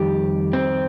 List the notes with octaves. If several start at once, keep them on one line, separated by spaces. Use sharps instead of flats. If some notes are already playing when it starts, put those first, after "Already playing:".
Already playing: F2 D#3 G3 G4
C4